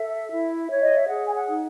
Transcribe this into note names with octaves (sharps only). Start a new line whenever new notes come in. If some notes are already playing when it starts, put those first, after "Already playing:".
Already playing: A4 E5
E4
C#5
D#5
E5
G#4 F#5
G#5
F#5
D#4